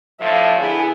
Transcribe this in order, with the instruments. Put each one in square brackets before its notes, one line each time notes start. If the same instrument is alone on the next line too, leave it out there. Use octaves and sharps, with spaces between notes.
[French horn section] A2 D3 F3 [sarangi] E5
[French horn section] D3 B3 E4 [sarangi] G#4